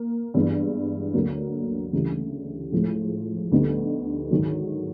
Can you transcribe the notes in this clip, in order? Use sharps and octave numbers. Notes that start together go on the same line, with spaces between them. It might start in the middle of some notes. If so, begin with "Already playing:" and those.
Already playing: A#3
G2 E3 G#3 B3
D2 D3 F#3 A#3
D2 C#3 E3 G3
A2 F3 G#3
D2 D3 G3 B3 D#4
G#2 D#3 F#3